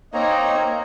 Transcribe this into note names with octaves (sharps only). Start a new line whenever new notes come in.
A#3 C4 D#4 C#5 D#5 A#5